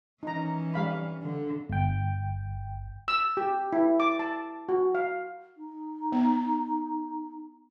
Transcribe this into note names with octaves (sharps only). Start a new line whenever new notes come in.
E3 C#4 D#4 A#5
G3 F5 B5
D3
G1 G5
E6
G4
E4
D6
A5
F#4
F5
D#4
B3